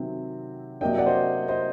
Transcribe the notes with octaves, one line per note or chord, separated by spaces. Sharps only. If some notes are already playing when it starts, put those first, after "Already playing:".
Already playing: C3 D#3 F#3 C4
C3 F#3 A#3 D4 D#5 G5
D5 F#5
C5 D#5
C5 D#5